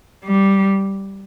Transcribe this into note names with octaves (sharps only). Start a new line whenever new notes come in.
G3